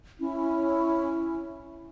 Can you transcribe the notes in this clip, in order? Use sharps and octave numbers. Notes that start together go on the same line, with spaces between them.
C#4 E4